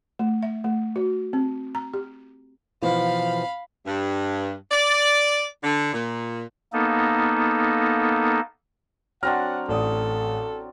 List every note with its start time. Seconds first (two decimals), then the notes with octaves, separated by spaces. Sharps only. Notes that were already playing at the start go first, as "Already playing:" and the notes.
0.19 A3
0.43 E5
0.64 A3
0.96 F#4
1.33 C4
1.75 A#5
1.94 G4
2.82 B2 E3 F3 F5 B5
3.85 G2
4.71 D5
5.63 D3
5.93 A#2
6.73 A#3 B3 D#4 A4
9.23 F#3 C4 D4 F#5 F6 A#6
9.69 A1 A4 D5 D#6